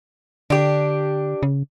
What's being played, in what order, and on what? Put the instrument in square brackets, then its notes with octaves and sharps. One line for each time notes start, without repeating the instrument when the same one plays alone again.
[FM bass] D3 [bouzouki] D4 G4
[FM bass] C#3